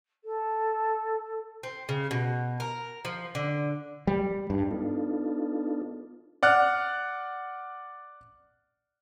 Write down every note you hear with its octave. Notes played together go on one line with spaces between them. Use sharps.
A4
C4
C#3
B2
A#4
F3
D3
G3
G2
B3 D4 D#4 F4 A4
D5 F#5 F6 F#6